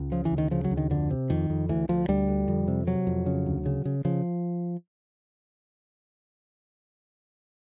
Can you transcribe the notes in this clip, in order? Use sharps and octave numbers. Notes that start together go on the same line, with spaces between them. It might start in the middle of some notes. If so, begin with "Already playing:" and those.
Already playing: C#2
C#3 F3
E3
D2
D#3
C#3 F3
F#3
D2
D#3
F2 D3
C3
F2 D#3
F2
D2 E3
D2 F3
D2 G3
D3
F2
C3
C3 F#3
F2
C#3
D2
C#3
C#3
C#3 F3